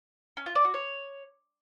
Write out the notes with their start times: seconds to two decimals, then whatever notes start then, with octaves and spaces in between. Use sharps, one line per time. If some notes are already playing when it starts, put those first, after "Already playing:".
0.37 C#4
0.46 F4
0.55 D5
0.65 F#4
0.74 C#5